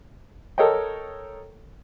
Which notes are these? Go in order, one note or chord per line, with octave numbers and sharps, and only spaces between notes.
A4 A#4 C#5 D#5 G5